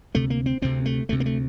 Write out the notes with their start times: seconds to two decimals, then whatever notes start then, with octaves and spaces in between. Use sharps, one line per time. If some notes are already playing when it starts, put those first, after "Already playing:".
0.15 D2 C3 A3
0.30 A#3
0.46 C4
0.62 D2 C3 C4
0.86 A3
1.09 D2 C3 A3
1.20 A#3
1.26 A3